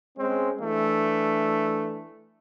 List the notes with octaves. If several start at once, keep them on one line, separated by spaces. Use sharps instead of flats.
G#3 C4 C#4
E3 A3 D4